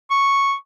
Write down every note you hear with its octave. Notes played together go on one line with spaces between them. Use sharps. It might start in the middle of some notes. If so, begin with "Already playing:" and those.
C#6